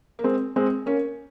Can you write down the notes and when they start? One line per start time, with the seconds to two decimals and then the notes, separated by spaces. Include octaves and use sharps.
0.19 A#3
0.24 G#3 C4
0.56 G#3 C4
0.86 A#3 C#4